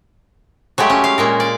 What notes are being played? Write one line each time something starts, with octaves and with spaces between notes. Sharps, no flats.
F#3 G#3 A3 G4
C#4
F5
A#2 G#3 A#4
D5